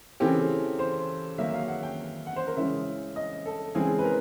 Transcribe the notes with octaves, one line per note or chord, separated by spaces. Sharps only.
C#3 E3 A3 C4 G4
C5
D#3 F#3 A#3 E5
E5
F5
F#5
G5
F#5
C5
A#4
C#3 E3 G#3 E5
D#5
A4
C#3 E3 G#3 C4 G#4
B4
A#4